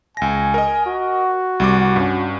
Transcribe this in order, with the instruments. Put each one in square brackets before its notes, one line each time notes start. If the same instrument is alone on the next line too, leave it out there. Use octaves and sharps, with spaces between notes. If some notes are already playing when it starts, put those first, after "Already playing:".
[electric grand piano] C#2 A#6 [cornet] G#5
[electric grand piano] A#4 D#5
[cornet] F#4
[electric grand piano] C2 G3 D6
G2 C#4